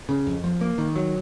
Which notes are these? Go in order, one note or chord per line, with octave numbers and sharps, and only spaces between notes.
C#3
F2
F3
A#3
D#3
F#3